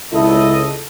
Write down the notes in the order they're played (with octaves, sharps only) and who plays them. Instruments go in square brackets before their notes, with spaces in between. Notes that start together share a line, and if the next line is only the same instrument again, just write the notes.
[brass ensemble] C#2 A4 D#5 [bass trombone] E4